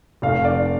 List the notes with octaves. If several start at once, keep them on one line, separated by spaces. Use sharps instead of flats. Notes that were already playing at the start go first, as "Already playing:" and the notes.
F1 F5
D5